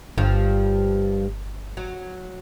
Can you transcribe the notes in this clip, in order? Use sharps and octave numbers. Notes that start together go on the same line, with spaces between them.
G1 G2 F3
F#3